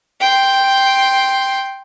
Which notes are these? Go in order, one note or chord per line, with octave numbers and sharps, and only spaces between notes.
G5 C6